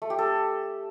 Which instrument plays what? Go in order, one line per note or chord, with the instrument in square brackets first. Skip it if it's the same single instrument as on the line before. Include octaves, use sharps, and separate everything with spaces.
[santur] A3
G4
A4